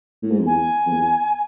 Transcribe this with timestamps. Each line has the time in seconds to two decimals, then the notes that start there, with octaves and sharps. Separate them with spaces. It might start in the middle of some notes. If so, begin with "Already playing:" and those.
0.23 A2
0.31 G#2
0.39 F2
0.46 E2 G#5
0.86 F2
0.93 E2